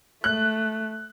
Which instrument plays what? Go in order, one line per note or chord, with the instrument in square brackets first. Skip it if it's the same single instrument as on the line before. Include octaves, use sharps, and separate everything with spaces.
[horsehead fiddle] A3 [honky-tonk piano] F#6